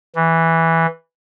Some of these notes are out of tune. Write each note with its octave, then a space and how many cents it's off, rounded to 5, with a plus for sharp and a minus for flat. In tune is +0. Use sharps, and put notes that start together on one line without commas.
E3 -5